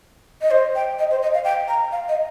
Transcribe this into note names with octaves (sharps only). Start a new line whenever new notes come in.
D#5
C5
G5
D#5
C5
D#5
F5
G5
A#5
F5
D#5